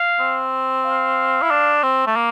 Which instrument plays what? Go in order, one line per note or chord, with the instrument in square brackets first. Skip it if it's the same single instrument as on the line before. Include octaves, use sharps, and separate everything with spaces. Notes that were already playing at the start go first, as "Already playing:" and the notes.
Already playing: [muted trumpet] F5
[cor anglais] C4
[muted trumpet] F5
[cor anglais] E4
D4
C4
A3
A#3